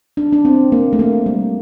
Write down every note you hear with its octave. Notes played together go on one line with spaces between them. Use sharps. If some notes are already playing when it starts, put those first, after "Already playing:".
D4
D4
C4
A#3
A3
A#3
G3